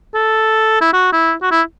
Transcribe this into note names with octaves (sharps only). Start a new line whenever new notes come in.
A4
E4
F#4
E4
F#4
E4